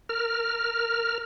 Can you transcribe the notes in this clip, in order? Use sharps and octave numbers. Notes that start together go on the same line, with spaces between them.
A#4 F6